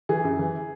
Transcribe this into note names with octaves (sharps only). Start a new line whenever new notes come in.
E3 G#4
F#2
E3